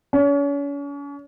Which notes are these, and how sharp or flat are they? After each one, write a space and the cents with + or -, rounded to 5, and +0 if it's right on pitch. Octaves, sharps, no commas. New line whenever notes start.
C#4 +40